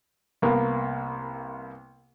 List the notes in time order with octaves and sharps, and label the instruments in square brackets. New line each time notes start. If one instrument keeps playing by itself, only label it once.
[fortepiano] C2 A#3 B3